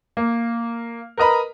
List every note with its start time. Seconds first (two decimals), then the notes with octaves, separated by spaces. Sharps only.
0.17 A#3
1.17 A#4 B4 D#5 A#5 B5